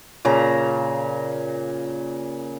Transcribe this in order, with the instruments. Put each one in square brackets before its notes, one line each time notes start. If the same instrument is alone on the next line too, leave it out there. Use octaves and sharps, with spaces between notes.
[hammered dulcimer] A#2 C#3 A#5